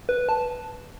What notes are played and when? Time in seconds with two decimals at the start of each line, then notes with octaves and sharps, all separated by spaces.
0.09 B4
0.29 A5